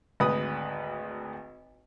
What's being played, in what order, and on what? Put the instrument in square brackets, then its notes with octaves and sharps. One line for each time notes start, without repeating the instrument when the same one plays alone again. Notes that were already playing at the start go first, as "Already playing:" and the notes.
[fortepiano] G#1 D2 B4 D#6